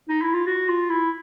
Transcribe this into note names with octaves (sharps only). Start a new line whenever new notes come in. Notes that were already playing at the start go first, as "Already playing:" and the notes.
D#4
E4
F4
F#4
F4
E4